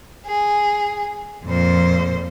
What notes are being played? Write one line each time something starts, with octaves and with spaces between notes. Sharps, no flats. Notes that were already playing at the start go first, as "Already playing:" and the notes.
G#4
F2 A#2 C5